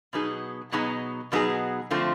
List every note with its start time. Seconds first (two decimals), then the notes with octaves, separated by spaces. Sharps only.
0.13 B2 F#3 B3 D#4 G#4
0.72 B2 F#3 B3 D#4 G#4
1.32 B2 F#3 B3 D#4 G#4
1.91 D3 F3 A3 C4 F4